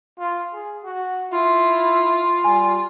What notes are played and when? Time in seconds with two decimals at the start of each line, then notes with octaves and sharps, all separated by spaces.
0.19 F4
0.54 G#4
0.84 F#4
1.32 E4 F4
2.44 G3 G#5